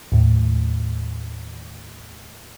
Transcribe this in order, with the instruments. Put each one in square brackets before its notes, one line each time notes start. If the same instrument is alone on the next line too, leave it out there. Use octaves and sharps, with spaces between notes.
[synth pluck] D#2 A2